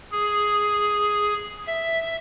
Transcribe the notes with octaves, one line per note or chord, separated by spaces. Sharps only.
G#4
E5